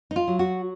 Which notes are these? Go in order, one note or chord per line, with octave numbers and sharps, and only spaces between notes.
D#4
F4
F#3
F#4